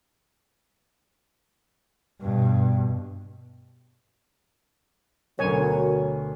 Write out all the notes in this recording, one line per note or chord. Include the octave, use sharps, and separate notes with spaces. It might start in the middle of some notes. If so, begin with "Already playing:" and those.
G2 B2
D2 B2 F#3 A#4 C#5 G#5